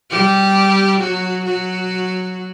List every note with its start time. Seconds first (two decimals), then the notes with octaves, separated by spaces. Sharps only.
0.10 G3 G4
1.00 F#3 F#4
1.45 F#3 F#4